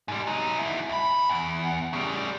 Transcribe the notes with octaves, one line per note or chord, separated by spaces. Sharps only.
G#2 G3
F#3 D#4
G#2 E4
C#2 B5
E2
C#3 G3